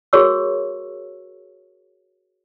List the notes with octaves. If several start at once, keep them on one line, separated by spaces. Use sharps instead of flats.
F#4 G#4 A#4 C#5 C#6 E6